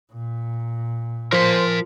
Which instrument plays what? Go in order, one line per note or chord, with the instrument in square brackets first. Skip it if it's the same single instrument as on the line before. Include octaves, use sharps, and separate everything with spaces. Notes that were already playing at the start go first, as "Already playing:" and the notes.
[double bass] A#2
[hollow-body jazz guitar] F3 [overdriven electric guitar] A#4 C6 [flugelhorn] C5